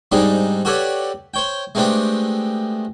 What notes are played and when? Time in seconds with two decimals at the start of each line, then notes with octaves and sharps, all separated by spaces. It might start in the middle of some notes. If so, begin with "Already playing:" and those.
0.12 G#2 G3 C4 D4 D#4 G#4
0.65 F#4 G4 A4 B4 C#5 D5
1.34 C5 C#5 G5
1.75 G#3 A3 B3 C4 D4 G4